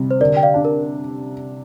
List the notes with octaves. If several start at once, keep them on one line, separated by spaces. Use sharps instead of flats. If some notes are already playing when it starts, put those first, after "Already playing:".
Already playing: C3 G3
C5
D3 A#4 D5
G5
D5 F5
D4
A#4